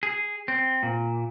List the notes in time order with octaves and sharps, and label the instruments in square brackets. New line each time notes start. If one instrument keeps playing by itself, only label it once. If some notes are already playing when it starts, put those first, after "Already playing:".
[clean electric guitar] G#4
C4
A#2